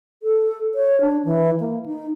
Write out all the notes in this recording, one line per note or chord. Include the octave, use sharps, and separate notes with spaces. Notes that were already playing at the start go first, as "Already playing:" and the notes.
A4
C#5
D4
E3
A#3
D#4